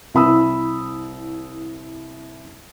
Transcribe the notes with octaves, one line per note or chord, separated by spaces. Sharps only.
C2 E4 B5 D#6 E6